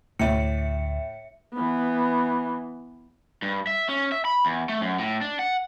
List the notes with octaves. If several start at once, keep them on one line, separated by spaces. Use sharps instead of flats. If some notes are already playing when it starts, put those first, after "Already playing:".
D2 A2 E5 C#7
E3 B3
G2
E5
C#4
E5
B5
E2
A3
F#2
A2
D4
F#5